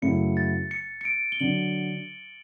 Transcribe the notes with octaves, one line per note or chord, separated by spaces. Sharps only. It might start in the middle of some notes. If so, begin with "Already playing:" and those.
F#2 C#3 F#3 A3 E4 C#7
A6
C#7
C#7
D7
G7
D3 F#3 F#7